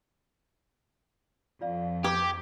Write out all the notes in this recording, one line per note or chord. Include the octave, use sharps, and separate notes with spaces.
F2 F4 D5 F5
G4 D6 D#6 G#6